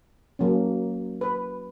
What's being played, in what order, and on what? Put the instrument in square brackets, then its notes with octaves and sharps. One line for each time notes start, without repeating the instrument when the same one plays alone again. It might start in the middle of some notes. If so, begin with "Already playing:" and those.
[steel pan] F#3 A#3 C#4
B4